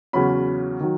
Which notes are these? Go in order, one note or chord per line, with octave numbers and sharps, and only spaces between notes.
E2 C#3 F#3 C#4 B5
D#3 F#3